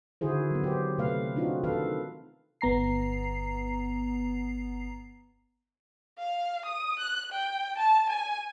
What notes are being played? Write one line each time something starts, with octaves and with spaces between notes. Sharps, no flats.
D3 D#3 E4 F#4 G#4 C5
F#3 B3
G4 C5
C3 A3 B4 F5
C4 D4 D#4 F4 F#4
D#3 A4 B4 F5
G1 B3 A#5 C7
F5
D#6
F#6
G5
A5
G#5